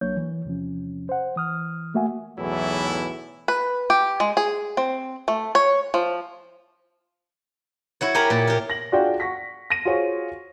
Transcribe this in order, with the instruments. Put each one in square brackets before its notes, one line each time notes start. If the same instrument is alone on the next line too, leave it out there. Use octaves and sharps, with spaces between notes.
[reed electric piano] C2 F#3 A#3 D4 C#5 G6
E3
E2 C3 F3 C#4
C5 F#5
E3 D#6 F6
A3 A#3 F#4 E5 F#5 G#5
[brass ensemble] B1 E2 A2 E3 F#3 E4
[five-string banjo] B4
G4
G#3
G#4
C4
A3
C#5
F3
[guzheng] E4 F#4 C#5
G4 A#4 G#5 A#5 B5
A#2
G4 A#4
[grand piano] A#6 F#7
D4 F4 F#4 G#4 D5 G5
F#5 C#6 A#6 B6
A#6 D#7
F4 F#4 G#4 C5 C#5